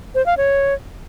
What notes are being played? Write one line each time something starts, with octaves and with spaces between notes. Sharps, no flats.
C5
F5
C#5